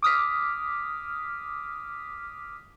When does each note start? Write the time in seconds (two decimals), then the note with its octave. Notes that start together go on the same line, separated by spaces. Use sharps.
0.02 D6 D#6 F6 B6